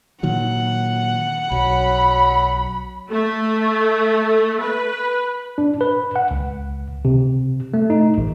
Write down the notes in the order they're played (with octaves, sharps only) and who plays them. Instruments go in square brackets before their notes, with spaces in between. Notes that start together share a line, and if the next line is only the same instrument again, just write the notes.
[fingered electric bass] A#2 D#3 F#3 [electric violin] F#5
[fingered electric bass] B1 [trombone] F#3 [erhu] B5
[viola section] A3
B4
[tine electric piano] D4
B4
F#5
C#2
C3
A3
D#4
A1